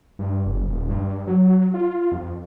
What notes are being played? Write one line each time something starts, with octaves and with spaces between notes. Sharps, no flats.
G2
F#1
D#1
G2
F#3
F4
F2